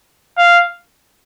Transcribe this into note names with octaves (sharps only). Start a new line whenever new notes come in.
F5